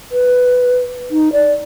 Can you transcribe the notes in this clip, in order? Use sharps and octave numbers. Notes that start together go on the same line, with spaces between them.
B4
D#4
D5